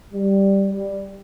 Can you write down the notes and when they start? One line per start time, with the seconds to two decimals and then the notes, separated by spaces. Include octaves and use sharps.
0.13 G3
0.72 G3